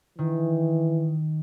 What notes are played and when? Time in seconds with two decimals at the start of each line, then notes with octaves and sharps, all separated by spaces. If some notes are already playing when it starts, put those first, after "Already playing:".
0.19 D#3 E3